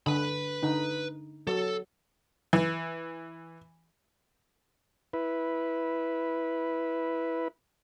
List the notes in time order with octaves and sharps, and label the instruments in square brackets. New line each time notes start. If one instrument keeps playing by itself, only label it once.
[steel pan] D3 [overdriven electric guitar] B4 B5
[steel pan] D3 D#4
[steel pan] F#3 [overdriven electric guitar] A4
[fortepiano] E3
[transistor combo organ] E4 B4